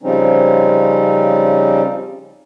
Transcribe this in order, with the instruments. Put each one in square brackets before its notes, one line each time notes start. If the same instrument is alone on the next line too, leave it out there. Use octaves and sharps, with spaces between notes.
[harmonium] C#3 F3 G3 C4 C#4 D#4